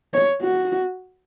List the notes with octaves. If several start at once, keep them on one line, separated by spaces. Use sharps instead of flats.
C#5
F#4